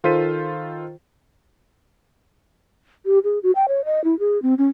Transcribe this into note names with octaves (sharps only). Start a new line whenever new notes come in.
D#3 F4 A4 C5 B6 D#7
G4
G#4
F#4
G5
C#5
D#5
E4
G#4
C4
C#4